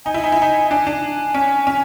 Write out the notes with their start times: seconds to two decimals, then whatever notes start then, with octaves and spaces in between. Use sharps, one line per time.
0.06 D#4 G#5
0.14 E4
0.23 D#4
0.32 E4
0.42 D#4
0.71 D4 G#5
0.87 D4
1.34 C#4
1.67 C#4